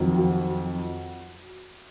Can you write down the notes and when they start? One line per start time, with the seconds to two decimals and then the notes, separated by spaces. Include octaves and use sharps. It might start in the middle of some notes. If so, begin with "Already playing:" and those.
Already playing: F2 D#3 F#3
0.17 F#4